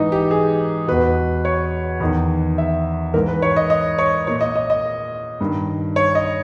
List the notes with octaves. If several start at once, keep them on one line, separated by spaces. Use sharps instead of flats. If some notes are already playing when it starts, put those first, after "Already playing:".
Already playing: G#2 E3 D#4
G4
G#4
E2 B2 B4
C#5
E2 D#3
E5
G#2 E3 A#4
B4
C#5
D#5
D#5
C#5
A#2 C#5
D#5
D#5
D#5
G2 D#3
C#5
D#5